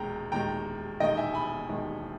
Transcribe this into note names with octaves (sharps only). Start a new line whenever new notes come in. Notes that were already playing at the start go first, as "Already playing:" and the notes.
Already playing: E1 D#2 D#3 G#3 G5 A#5
E1 D#2 D#3 G#3 G5 A#5
E1 D#2 D#3 G#3 D#5 G5
E5 G#5
G#5 B5
E1 D#2 D#3 G#3